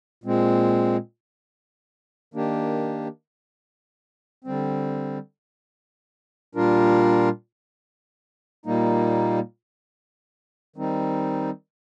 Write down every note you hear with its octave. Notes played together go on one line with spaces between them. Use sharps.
A#2 G#3 C4
D#3 A#3 D4 G4
D3 G3 C4
A#2 G3 D4 F4 A#4
A#2 G3 A#3 D#4
D#3 G3 C4 D#4